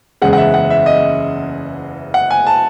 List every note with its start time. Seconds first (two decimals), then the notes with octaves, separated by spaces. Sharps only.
0.22 F#1 E2 C#3 G#3 F#5
0.33 F#5
0.38 E5
0.54 F#5
0.70 E5
0.86 D#5
2.14 F#5
2.31 G#5
2.47 A5